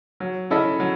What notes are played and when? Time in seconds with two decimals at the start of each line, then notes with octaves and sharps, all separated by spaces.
0.20 F#3
0.50 C#4 E4 A4 D#5
0.80 F#3